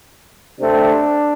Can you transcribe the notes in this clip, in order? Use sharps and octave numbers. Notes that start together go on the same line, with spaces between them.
C3 A3 C4 D4